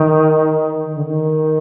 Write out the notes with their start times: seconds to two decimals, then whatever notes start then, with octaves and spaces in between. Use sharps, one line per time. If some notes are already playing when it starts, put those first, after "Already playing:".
Already playing: D#3
0.85 D#3
0.95 D3
1.05 D#3